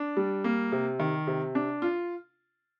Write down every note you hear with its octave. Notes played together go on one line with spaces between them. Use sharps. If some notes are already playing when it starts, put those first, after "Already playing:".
Already playing: D4
G3
A#3
C3
D#3
C3
D4
F4